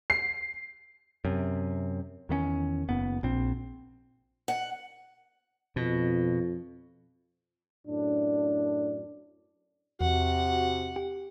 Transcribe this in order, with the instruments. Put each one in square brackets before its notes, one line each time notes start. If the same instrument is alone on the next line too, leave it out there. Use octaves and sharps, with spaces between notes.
[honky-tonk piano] C7
[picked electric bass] F#2 C3
E2 D#3 B3 C#4
F#1 B3
A#1 C4
[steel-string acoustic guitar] F#5
[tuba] F2 [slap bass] B2
[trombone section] F#2 A2 D4
[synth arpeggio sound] E2 [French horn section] C3 F#4 [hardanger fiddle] F#5
[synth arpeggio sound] G4